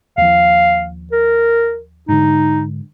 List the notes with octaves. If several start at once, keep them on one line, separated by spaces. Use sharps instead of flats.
D#2 F3 F5
A#4
G#2 D3 D#4